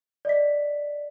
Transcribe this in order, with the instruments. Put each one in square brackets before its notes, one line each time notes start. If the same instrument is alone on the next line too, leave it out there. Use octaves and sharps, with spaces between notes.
[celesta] D5 D#5 B6